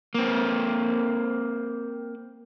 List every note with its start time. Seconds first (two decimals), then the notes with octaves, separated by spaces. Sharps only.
0.15 A#3 C4